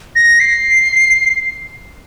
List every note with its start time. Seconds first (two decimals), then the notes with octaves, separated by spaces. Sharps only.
0.16 A#6
0.40 C7